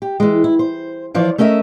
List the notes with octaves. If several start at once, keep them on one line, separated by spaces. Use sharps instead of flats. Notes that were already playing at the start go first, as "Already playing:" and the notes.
G4
E3 G#3
E4
C5
E3 F3 F4 C#5 D5
A3 C#4 A#4 D#5 E5